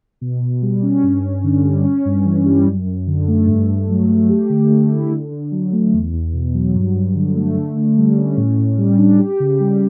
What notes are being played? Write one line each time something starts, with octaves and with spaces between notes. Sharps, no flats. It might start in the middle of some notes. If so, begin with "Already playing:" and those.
B2
B2
G3
C#4
G2
G2
D3
G3
C#4
G2
E3
G3
F#2
F#2
D3
A3
G2
G2
F#3
A3
G4
D3
A3
E4
D3
D3
F#3
A3
E2
E2
B2
F#3
G2
G2
D3
A3
D3
D3
G3
C#4
A2
A2
G3
D4
G4
C#3
G3